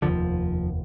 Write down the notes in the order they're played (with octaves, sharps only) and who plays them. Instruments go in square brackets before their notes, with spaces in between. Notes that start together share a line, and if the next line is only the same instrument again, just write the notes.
[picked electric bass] F1 D#2 D3 F3